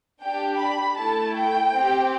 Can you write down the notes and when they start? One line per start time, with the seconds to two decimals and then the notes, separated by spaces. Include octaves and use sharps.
0.21 D4 G4 G5
0.59 B5
0.97 A3 E4 A4 A5
1.37 G5
1.74 C4 G4